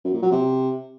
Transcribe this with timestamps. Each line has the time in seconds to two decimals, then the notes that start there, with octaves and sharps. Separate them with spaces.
0.05 F#2
0.14 A#2
0.22 F#3
0.31 C3